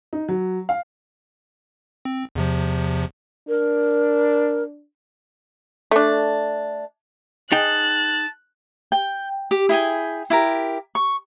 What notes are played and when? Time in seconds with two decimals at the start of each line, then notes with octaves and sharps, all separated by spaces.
0.13 D#4
0.29 F#3
0.69 F5
2.05 C4
2.35 E2 C3 F3
3.48 D4 A#4
5.91 A3 D4
7.52 D#4 G#4 G5 A5 F#6
8.92 G5
9.51 G4
9.69 E4 G#4 G5 G#5
10.30 E4 G4 A#4
10.95 C#6